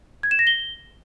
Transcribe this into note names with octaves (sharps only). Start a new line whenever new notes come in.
G#6
E7
A#6
G7